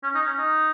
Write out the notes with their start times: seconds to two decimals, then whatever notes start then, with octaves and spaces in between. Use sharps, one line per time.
0.03 C#4
0.15 D#4
0.26 C#4
0.38 D#4